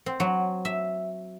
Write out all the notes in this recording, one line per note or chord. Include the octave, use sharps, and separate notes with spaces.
C4
F#3
E5